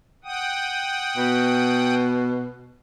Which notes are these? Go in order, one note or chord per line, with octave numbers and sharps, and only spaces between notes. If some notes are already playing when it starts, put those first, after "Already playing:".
F#5 G5 D#6
B2